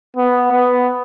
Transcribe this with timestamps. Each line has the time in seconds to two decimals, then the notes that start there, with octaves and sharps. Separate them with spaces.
0.17 B3
0.52 B3